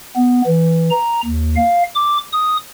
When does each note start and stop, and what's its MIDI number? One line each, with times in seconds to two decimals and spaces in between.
0.16 0.42 59
0.47 0.90 52
0.91 1.21 82
1.25 1.56 39
1.56 1.83 77
1.95 2.18 86
2.33 2.57 87